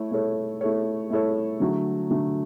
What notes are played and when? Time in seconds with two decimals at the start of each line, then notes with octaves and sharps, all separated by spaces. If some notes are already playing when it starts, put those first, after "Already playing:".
Already playing: A3 E4 C#5
0.11 A3 E4 A4 C#5
0.61 A3 E4 A4 C#5
1.10 A3 E4 A4 C#5
1.60 D3 F#3 A3
2.10 D3 F#3 A3